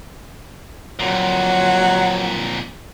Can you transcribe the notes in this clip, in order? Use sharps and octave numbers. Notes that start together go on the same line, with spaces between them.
F2 A#2 F#3